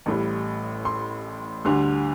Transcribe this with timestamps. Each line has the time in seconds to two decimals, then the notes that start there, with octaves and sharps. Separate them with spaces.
0.06 A1 A2 G3
0.85 C6
1.65 D2 D3 G3 C6